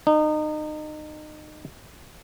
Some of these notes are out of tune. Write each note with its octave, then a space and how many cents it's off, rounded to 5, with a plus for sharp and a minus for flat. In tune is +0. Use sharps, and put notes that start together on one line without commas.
D#4 -30